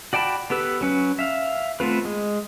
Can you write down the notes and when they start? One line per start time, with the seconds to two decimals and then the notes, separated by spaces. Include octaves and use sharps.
0.13 F#4 D5 G5 A5 B5
0.50 B3 G4 A4 B4
0.81 F#3 C#4 B4
1.19 E5 F5
1.80 A3 B3 C4 F4 B4
2.05 G#3